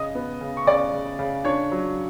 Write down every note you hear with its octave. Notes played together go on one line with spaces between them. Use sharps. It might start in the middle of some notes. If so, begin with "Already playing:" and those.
Already playing: C#3 D#5 D#6
B3
C#3
C#6
C#3 D5 D6
C#3
C#3
D4 C#5 C#6
F#3